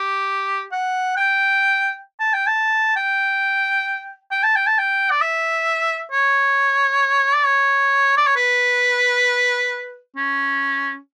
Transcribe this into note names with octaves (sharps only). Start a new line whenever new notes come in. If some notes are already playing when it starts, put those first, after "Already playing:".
Already playing: G4
F#5
G5
A5
G5
A5
G5
G5
A5
G5
A5
G5
D5
E5
C#5
D5
C#5
D5
C#5
B4
C#4